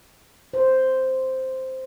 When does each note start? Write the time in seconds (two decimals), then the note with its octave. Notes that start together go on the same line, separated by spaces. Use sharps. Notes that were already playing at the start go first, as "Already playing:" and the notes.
0.54 C5